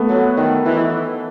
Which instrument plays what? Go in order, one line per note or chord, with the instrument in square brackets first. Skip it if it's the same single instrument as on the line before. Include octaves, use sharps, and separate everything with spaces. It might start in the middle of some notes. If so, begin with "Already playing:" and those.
Already playing: [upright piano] A3 B3
[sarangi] F#3
D#3
E3